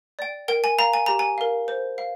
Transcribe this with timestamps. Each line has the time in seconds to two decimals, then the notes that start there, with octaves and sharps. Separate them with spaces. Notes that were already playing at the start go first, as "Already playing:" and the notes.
0.19 D5 G5
0.48 A#4 G5
0.64 G#5
0.78 F5 A#5
0.93 G#5
1.06 G4 A#5
1.19 G#5
1.38 A#4 F5
1.68 C5
1.98 F5